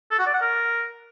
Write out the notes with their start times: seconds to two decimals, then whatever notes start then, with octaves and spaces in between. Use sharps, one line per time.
0.11 A4
0.18 F#4
0.26 D5
0.34 F#5
0.41 A#4